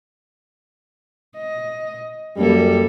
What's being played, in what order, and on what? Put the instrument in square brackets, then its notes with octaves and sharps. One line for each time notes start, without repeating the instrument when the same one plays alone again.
[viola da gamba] D#5
[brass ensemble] F#2 G3 [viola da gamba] A#3 A4